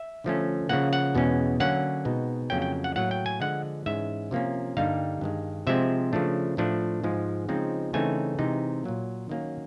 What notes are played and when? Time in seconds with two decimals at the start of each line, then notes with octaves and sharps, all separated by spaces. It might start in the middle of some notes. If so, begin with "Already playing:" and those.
Already playing: E5
0.24 D3 F3 A3 C#4
0.69 C#3 F3 A#3 F#5
0.93 F#5
1.15 E2 B2 G#3 C#4
1.60 D3 F#3 A#3 C#4 F#5
2.05 B2 G#3 C4 D#4
2.50 F2 C#3 F#3 A#3 C#4 G5
2.62 G5
2.84 F#5
2.96 A2 F#3 A#3 F#5
3.11 G5
3.26 G#5
3.41 D3 F3 G#3 F#5
3.86 G#2 E3 G#3 C#4 E5
4.31 C3 F3 A#3 C#4
4.77 G2 D3 G3 A#3 D#4 F5
5.21 G2 D#3 G#3
5.67 C3 F3 G#3 C4 E5
6.13 C#3 F3 A3 D4
6.57 A2 F3 A3 D4
7.04 G#2 F3 G#3
7.49 C#3 F3 G#3 C4 D#4
7.93 C#3 E3 A3 C4 D#4 G#5
8.39 C3 E3 G#3 C4 D#4
8.84 A#2 F#3 A#3
9.29 D#3 F#3 A#3 C#4